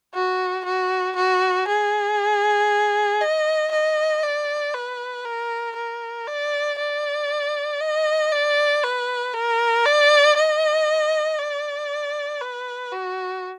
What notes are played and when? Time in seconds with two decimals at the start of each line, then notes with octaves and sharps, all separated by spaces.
0.14 F#4
0.65 F#4
1.16 F#4
1.68 G#4
3.21 D#5
3.72 D#5
4.23 D5
4.74 B4
5.25 A#4
5.76 A#4
6.27 D5
6.79 D5
7.81 D#5
8.32 D5
8.84 B4
9.34 A#4
9.86 D5
10.36 D#5
11.38 D5
12.41 B4
12.92 F#4